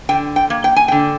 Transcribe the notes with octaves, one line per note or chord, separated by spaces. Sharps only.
D3 G5
G5
A#3
G5
G#5
D3 G5